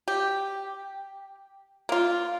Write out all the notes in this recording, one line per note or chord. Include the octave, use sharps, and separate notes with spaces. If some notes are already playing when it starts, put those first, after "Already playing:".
G4
A#3 F4